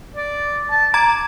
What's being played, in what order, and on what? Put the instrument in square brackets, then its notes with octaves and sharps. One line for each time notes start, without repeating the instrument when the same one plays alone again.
[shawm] D5
A5
[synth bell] A#5 G#6 [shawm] D6